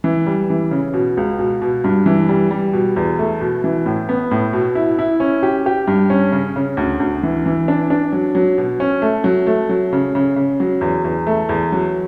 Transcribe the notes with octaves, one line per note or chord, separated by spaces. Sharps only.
E3
G3
E3
C#3
B2
C#2
B2
B2
G2
E3
G3
G3
B2
E2
A3
B2
E3
A2
B3
A2
B2
E4
E4
C#4
G4
G4
G2
C#4
C#3
C#3
D2
D2
E3
E3
D4
D4
F#3
F#3
B2
C#4
A3
F#3
A3
F#3
C#3
C#3
C#3
F#3
E2
E2
A3
E2
F#3